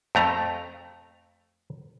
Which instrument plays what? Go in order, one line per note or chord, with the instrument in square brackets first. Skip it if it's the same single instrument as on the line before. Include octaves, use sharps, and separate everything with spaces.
[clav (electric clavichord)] F2 A3 A#5